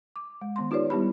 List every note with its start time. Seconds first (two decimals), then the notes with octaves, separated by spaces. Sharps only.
0.16 D6
0.41 G#3
0.56 D#3 B3 C6
0.71 D#4 F4 G4 B4 C#5 D5
0.90 G3 B3 E4 G4 B5